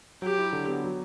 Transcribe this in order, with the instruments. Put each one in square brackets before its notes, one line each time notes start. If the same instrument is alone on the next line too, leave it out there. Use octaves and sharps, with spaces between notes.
[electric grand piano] F#3 [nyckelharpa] G4
[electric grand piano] E4
D3
B3
F#3